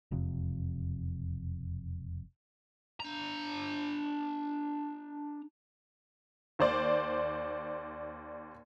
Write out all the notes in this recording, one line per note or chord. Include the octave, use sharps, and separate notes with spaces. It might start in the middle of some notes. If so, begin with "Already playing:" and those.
E1 F2 C3
D4 A#5
D#2 C5 D5